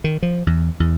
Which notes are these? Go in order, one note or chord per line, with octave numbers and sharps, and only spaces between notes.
D#3
F3
E2
E2